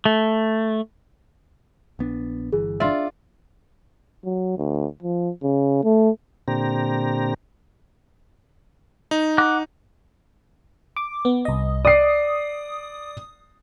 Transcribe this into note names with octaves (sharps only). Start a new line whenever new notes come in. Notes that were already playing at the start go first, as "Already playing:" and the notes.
A3
A#1 B3 D4
G1 E3 G#4
D4 F4 D5 E5
F#3
D2
F3
C#3
A3
A#2 D3 C4 G4 A#5
D#4
F#5 D6 F#6
D6
B3
C2 D#5
D5 D#6 C7